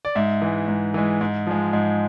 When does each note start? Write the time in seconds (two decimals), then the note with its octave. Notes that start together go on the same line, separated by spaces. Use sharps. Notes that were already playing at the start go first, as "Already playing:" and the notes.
0.05 D5
0.15 G#2 E5
0.42 E3 G#3
0.68 G#2
0.94 E3 G#3
1.21 G#2
1.47 F3 G#3
1.73 G#2